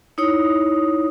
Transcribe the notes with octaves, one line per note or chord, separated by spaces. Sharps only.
D#4 E4 C#5 D#6